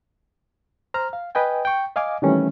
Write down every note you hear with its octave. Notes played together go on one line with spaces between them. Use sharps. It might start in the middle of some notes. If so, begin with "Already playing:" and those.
C5 A#5 F6
F5
B4 D#5 G5 G#5
G5 C#6
D#5 F5 G#5 D6
C3 D#3 E3 G3 A3 C#4